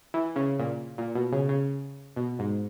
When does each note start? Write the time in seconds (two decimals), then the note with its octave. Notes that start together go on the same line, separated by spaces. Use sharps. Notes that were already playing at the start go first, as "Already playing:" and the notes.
0.14 E3
0.36 C#3
0.59 A#2
0.98 A#2
1.15 B2
1.32 C#3
1.49 C#3
2.16 B2
2.39 G#2